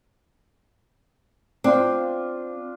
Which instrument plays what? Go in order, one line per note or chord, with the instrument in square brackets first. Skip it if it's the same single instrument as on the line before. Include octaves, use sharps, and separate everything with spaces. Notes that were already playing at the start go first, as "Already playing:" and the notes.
[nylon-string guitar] C4 [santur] D4 F4